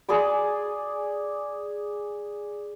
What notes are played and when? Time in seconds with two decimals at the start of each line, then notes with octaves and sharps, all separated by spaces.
0.09 G#4 D5 C6 D6